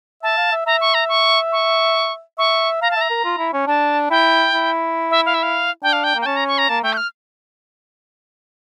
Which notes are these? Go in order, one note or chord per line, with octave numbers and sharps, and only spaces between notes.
E5 A5
F5
E5
E5 A#5
C#6
A#5
C#6
C#6
E5 C#6
F5 A#5
A5
E5 A#5
A#4
F4
E4
C#4
D4 A5
E4 G5
E4
E5
F5
E5
F5
D4 G5
F5
G5
A#3
G5
C#4 A5
A#5
C#6
A#5
A#3 A5
A3 G5
G6
F6